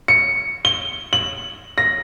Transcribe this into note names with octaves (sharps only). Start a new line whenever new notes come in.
C#7
G7
F#7
A#6